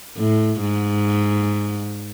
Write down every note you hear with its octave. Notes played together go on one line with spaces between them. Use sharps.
A2
G#2